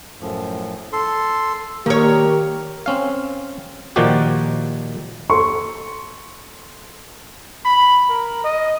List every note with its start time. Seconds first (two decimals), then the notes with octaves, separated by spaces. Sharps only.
0.21 F#2 A2 F3
0.93 A4 C6
1.86 D#3 A#3 G4 A#4 C#5
2.86 C4 C#4 F5
3.96 A#2 D#3 F3 D#4 F#4 G4
5.30 A4 C6 C#6
7.65 B5
8.10 A#4
8.44 D#5